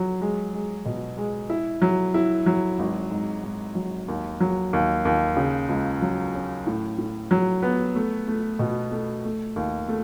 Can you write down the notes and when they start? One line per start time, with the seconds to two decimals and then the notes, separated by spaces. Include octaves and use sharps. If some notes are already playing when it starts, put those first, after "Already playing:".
Already playing: F#3
0.21 G#3
0.54 G#3
0.85 B2
1.17 G#3
1.50 E4
1.82 F#3
2.14 E4
2.46 F#3
2.79 G#1
3.11 G#2
3.44 G#2
3.75 F#3
4.08 D#2
4.40 F#3
4.73 D#2
5.05 D#2
5.37 C#3
5.69 C#2
6.02 F#3
6.34 C#4
6.67 A2
6.98 A2
7.31 F#3
7.63 B3
7.96 A3
8.28 A3
8.59 B2
8.92 A3
9.25 A3
9.56 D#2
9.88 A3